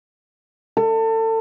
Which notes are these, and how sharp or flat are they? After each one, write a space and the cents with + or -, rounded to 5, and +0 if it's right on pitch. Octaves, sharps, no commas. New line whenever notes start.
A4 +30